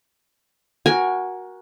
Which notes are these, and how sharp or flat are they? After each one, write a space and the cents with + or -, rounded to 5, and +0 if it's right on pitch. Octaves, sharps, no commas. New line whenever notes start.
F#4 +0 A#4 +20 G#5 -5